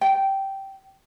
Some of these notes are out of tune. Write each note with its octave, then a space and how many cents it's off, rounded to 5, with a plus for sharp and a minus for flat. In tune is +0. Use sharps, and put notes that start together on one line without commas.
G5 -10